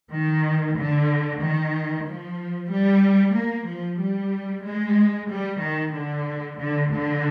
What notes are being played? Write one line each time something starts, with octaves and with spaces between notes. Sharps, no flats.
D#3
D3
D#3
F3
G3
A#3
F3
G3
G#3
G3
D#3
D3
D3
D3